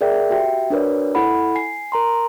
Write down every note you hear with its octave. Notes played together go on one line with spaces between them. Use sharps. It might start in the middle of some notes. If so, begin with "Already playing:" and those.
G#4 A#4 D5 E5 G5
F#4 G4 E5 G5
D4 F#4 A#4 B4 C#5 D5
E4 A4 F#5 B5
G#5 C7
A#4 A#5 C6